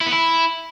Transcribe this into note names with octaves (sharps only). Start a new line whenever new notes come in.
E4
B3
E4